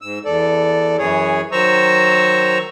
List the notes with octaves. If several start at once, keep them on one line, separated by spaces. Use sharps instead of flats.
G#2 E6
E2 A4 D5
F#2 E3 G#4 C#5
D#3 F#3 C5 A#5 C#6 E6